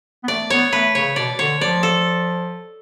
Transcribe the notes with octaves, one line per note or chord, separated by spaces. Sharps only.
B3
A3 D5
B3 C#5
A3 B4
C#3 C#5
B2 D5
D3 C#5
F3 D5
A4